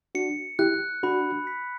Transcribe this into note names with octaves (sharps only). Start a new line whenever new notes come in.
D4 F#4 C#7
E4 G4 F#6
D4 F#4 B5
B6